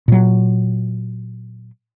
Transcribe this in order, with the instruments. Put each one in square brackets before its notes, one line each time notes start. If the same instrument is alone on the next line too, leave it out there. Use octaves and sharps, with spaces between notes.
[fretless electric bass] A#2 F#3